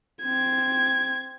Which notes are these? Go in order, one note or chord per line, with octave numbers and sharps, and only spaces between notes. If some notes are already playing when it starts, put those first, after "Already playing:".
C4 G#6